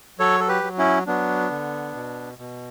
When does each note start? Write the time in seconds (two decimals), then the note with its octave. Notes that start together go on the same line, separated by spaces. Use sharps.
0.19 F#3 A4 C#5
0.40 A4
0.48 G4 B4
0.63 F#3
0.78 C#4 E4
1.07 F#3 B3 D4
1.51 D3
1.95 B2
2.38 B2